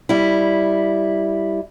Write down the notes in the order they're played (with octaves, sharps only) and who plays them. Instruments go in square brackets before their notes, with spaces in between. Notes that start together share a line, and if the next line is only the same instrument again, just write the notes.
[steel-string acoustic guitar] G3 E4